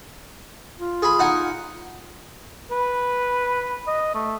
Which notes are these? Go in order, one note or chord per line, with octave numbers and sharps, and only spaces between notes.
F4
G#4 B5
D#4 F#5 G#5
B4
D#5
A3